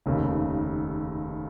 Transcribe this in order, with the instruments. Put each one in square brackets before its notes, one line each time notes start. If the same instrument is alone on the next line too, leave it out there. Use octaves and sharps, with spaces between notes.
[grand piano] F1 D#2 C#3